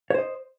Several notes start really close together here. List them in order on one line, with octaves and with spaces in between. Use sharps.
C#5 C5 D#5